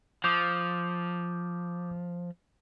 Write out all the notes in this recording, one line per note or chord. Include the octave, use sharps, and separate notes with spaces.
F3 D6 D#6 G6